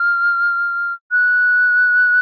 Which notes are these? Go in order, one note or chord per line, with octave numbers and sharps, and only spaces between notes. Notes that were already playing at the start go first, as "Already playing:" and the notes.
Already playing: F6
F#6